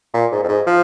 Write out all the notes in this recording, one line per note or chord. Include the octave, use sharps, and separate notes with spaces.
A#2
G#2
F2
G#2
F3